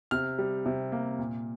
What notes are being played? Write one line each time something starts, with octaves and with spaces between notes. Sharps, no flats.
C3 F6
G3
C3
A#3
A#2